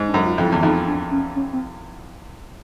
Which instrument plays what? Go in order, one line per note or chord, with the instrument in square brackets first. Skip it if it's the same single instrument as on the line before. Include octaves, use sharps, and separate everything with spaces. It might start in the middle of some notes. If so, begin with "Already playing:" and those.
Already playing: [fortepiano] G#2
[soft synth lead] D4
[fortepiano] F#2
[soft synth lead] F4
[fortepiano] F2
[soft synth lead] E4
[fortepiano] E2
[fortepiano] F2 [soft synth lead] D#4
[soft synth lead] D4
C#4
C#4
C4